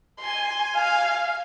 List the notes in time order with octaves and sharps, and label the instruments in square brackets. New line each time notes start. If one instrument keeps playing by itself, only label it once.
[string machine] G#5 [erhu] C6
[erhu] F5